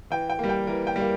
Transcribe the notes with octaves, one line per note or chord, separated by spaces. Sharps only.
E3 G5
G5
G3 A#3
G5
E3 A#4
G5
G3 A#3